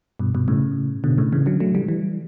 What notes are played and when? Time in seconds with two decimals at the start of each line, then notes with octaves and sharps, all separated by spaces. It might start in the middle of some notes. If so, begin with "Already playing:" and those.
0.20 G2 B2
0.34 G2 B2
0.48 A2 C#3
1.04 B2 D3
1.18 A2 C#3
1.33 C#3 E3
1.46 D3 F#3
1.60 F#3 A3
1.75 E3 G3
1.88 E3 G3